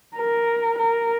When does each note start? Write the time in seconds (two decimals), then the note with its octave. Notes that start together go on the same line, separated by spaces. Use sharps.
0.17 A#4
0.79 A#4